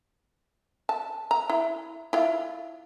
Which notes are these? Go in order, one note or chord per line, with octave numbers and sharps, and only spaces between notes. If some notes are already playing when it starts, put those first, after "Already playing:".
A5
A#5
E4
E4 F4